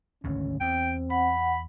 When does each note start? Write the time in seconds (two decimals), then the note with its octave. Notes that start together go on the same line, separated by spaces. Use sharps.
0.24 G#1 D2 C#3 C#4
0.61 E2 C4 G5
1.10 F#5 B5